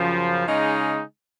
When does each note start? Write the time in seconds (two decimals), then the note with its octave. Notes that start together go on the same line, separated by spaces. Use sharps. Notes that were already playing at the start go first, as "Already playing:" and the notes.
Already playing: F#2 C#3 F3
0.46 C#3 G#3 D#4